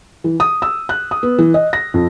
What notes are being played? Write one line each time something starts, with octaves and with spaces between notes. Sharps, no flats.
E3
D#6
E6
F#6
D#6
B3
E3
D#5
A#6
F2